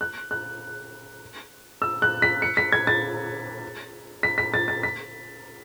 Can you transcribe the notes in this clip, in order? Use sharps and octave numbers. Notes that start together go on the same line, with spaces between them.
F#6
F#6
E6
F#6
B6
C#7
B6
G#6
A6
B6
B6
A6
A6
B6